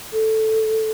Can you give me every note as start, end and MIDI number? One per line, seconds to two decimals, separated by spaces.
0.13 0.91 69